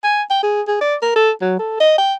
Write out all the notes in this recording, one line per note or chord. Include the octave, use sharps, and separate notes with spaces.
G#5
G5
G#4
G#4
D5
A#4
A4
F#3
A4
D#5
G5